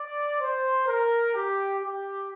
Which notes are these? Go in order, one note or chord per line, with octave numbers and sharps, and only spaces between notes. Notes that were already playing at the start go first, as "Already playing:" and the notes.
Already playing: D5
C5
A#4
G4
G4